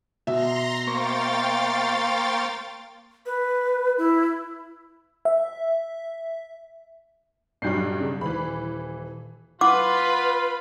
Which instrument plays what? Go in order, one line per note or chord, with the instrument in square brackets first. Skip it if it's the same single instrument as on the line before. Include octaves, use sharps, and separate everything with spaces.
[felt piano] B2 E5 [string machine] A#5 C6 A#6
[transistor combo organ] A#3 C5 C#6 [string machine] F5 G5 A6
[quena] B4
E4
[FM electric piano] E5
[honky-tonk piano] B1 G2 F#3 [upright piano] G3 G6 C7
[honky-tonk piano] C#3
[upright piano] D#1 [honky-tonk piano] E3 B5
[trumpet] F4 [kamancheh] B4 B5 [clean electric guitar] F#5 [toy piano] D6